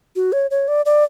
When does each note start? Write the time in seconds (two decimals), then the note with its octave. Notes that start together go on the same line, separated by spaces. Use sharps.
0.16 F#4
0.32 C#5
0.51 C#5
0.68 D5
0.86 D5